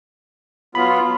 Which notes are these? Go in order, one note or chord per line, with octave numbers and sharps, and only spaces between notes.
F#3 B3 F4 B5